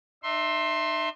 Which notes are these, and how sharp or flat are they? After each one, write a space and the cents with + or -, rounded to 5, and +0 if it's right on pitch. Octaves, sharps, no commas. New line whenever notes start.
D#4 -40 E5 +0 C6 +15